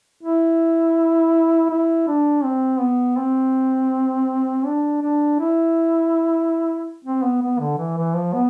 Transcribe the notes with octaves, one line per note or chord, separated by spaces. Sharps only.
E4
E4
D4
C4
B3
C4
D4
D4
E4
C4
B3
B3
D3
E3
E3
F3
B3